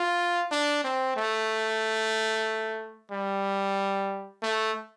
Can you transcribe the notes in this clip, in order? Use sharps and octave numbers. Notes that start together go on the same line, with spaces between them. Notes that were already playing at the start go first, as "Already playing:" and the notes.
Already playing: F4
D4
C4
A3
G3
A3